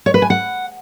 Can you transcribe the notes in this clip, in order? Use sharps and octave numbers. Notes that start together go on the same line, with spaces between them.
C#5
B4
G#5
F#5